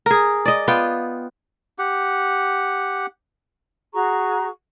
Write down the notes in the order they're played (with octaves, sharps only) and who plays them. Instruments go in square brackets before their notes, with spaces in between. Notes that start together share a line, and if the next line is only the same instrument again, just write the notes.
[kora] G#4 A#4
D5 D#5
B3 F4 G5
[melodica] G4 F#5
[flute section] F#4 G#4 A#5 C#6